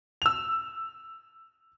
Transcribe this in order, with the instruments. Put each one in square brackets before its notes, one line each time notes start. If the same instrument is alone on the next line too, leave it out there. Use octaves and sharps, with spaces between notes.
[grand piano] E6 F7